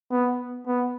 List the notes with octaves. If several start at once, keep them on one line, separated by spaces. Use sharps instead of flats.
B3
B3